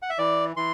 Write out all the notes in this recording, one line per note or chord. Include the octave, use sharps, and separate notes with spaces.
F#5
E5
E3 D5
E3 C6